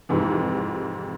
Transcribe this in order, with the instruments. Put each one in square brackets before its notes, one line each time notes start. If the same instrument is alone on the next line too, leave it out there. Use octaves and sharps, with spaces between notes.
[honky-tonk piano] F2 G#2 C3 E3